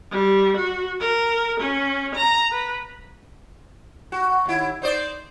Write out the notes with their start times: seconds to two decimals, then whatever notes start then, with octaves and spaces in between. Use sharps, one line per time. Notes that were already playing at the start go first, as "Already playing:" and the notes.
0.11 G3
0.56 F#4
1.00 A#4
1.60 C#4
2.15 A#5
2.51 B4
4.12 F#4
4.46 D#2 E4
4.82 D#4 C5 D5